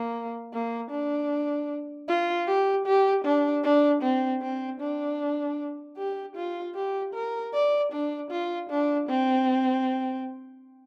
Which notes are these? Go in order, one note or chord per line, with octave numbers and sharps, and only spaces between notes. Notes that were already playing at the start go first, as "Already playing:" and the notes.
Already playing: A#3
A#3
D4
F4
G4
G4
D4
D4
C4
C4
D4
G4
F4
G4
A#4
D5
D4
F4
D4
C4